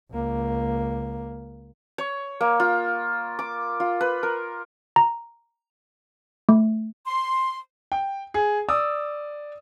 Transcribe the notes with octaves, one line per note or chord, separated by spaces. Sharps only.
C#2 A#3
C#5
A#3
F4
D6
F4
B4
A#4
A#5
A3
C6
G5
G#4
D5 D#6 E6